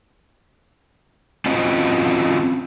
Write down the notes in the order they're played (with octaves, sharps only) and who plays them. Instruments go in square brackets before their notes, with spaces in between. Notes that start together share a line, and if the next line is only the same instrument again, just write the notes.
[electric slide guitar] C4 C#4 F4 F#4 D#5